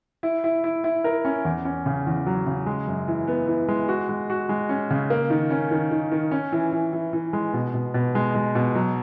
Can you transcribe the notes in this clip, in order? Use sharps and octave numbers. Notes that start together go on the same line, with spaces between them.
E4
E4
E4
E4
A#4
C#4
E2
C#4
C#3
E2
F#3
C#3
G#3
F#2
E3
B3
E3
G#3
F#4
G#3
F#4
G#3
C#4
C#3
A#3
D#3
C#4
D#3
D#3
D#3
C#4
E3
E3
E3
E3
G#3
B2
B2
B2
G#3
G#3
B2
F#3